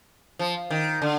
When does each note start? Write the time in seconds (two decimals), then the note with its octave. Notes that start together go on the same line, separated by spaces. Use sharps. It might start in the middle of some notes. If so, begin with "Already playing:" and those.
0.39 F3
0.70 D#3
1.02 D3